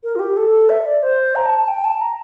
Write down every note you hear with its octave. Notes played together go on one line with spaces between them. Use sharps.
A#4
F4
G4
A4
E5
D5
C5
A#5
A5
A5
G5
A5
A#5